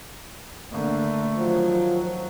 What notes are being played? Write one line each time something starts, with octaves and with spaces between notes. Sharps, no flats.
D3 A3 A#3
D#3 F3 F#3